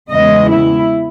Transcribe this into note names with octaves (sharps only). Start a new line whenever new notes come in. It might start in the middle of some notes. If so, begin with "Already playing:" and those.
E2 C#3 G#3 B3 D#5
E4